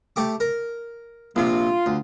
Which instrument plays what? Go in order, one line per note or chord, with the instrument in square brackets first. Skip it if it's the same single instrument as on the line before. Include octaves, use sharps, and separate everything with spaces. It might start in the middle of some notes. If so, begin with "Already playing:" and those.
[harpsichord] A3 G4 D6
A#4
[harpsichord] A#1 C3 [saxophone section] F4
[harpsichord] D2